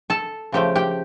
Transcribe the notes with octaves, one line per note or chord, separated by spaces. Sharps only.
A4 A5
C#3 F3 A3 G4 G5
G4 G5